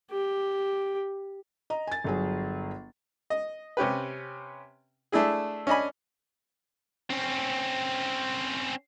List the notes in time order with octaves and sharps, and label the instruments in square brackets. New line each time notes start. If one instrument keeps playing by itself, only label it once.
[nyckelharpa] G4
[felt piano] D#5 A#5
G#5 A6
G1 F#3 G#4
[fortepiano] D#5
C3 C#4 G4 B4
A3 D4 E4 G#4
C#4 D4 D#5 G#5 B5
[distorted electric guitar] C4 C#4